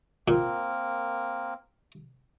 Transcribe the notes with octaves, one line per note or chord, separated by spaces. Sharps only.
A#2 A#3 C4 A#4